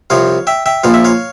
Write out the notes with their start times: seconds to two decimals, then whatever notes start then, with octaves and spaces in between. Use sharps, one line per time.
0.10 C2 C3 F3 C#5 F5
0.47 E5 G5
0.66 E5 G5
0.84 A#1 A#2 F3 F5
0.94 E5
1.04 C#5 F5